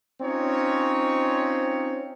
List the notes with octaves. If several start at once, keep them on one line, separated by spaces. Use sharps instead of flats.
C4 C#4 D#4 F4 C#5